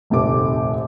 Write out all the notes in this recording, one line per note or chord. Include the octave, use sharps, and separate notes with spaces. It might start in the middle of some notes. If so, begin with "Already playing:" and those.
F1 A#1 D#2 A4 D6